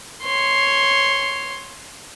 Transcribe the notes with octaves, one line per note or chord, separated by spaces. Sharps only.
C#5 C6